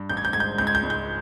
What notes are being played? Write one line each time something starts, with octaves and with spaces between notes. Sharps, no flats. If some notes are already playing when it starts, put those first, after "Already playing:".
Already playing: G2
A1 G6
G#6
G6
G#2 G#6
G6
C#2 G6
G#6
G6
C#2
G6